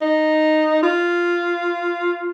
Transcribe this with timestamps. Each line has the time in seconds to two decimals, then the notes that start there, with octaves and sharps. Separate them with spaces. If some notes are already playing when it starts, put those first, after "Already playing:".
0.02 D#4
0.83 F4